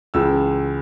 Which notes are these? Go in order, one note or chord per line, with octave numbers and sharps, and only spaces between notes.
C#2 C#3 E3 E6